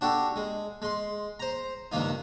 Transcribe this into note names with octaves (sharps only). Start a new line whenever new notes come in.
D4 F#4 G4 A4
G#3
G#3 C6
C5 A#5
C#2 G2 D#3 A#3 D#4